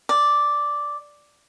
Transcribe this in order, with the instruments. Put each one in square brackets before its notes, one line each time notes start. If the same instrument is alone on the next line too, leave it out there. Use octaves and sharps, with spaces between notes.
[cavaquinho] D5